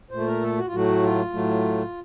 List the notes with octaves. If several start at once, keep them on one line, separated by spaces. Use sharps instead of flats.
A#2 A3 C5
A#4
A4
F#4
F4
A2 F#3 A3 F#4
F4
A2 F#3 A3